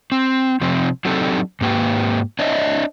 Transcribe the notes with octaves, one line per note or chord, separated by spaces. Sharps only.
C4
C3 F3 C4
F#3 C4 D4 D#4 G4 A4
G#2 A#3 G4 B4
D4 C#5 D#5 E5